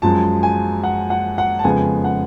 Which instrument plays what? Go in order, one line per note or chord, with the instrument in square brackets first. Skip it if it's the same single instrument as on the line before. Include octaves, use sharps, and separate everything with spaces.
[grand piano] F#2 F3 G#3 A5
G#5
F#5
F#5
F#5
A5
F2 C#3 G#3 B3 G#5
F#5